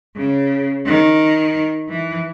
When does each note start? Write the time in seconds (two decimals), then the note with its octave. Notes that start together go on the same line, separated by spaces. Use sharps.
0.15 C#3
0.85 D#3
1.89 E3